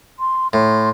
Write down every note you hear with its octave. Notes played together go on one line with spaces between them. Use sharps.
C6
A2 C6